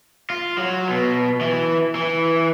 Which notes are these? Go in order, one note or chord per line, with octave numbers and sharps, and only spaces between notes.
F4
F#3
B2
E3
E3